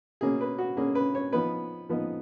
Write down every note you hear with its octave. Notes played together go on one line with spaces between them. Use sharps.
B2 A#3 C#4 G#4
B4
F#4
B2 A#3 C#4 G#4
B4
C#5
F3 B3 D#4 B4
F3 B3 D#4